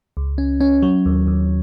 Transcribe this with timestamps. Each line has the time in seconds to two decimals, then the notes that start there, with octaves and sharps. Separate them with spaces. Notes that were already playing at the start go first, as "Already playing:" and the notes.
0.17 C#2
0.38 C#4
0.60 C#4
0.82 F#3
1.06 D#2
1.27 D#2